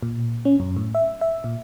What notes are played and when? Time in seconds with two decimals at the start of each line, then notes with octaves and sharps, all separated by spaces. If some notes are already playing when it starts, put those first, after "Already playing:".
0.03 A#2
0.45 C#4
0.60 F#2
0.76 A2
0.95 E5
1.21 E5
1.44 A#2